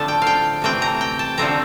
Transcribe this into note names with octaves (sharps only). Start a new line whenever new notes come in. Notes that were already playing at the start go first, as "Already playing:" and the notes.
Already playing: A2 D3 F3 A3 C4 A5
G5
F5 G5
C3 E3 A3 C4 G5
A#5
G5
A5
D3 F3 A3 C4 A#5